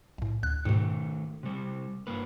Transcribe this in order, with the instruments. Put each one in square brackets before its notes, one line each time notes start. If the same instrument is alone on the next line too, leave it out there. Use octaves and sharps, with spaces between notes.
[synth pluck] B1 A2
D2 F#6
[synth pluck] G#2 B2 [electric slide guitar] D#3 A3
[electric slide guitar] C3 G3
G2 A#3 B4